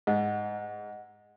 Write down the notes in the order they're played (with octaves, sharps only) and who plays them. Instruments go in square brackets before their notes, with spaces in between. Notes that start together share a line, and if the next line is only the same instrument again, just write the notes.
[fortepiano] G#2 [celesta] D#5 F#5